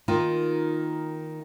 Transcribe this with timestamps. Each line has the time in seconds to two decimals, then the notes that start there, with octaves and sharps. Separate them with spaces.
0.08 D#3 A#3 D#4 F4